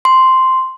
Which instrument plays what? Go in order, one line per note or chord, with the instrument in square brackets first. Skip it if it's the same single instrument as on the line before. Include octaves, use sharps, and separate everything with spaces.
[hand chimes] C6